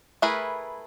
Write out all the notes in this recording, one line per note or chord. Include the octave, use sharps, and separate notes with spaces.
A3 E4 G#4 A#4 B4